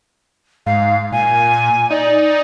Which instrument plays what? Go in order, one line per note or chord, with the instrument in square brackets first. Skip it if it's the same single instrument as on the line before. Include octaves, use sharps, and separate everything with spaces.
[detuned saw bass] G#2 [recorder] F5
[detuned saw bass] A#2 [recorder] G#5
[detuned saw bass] D#4 [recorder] D5